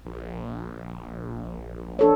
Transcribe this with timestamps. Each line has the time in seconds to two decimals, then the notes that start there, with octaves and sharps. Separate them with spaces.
0.05 A#1
1.99 D4 A4 C#5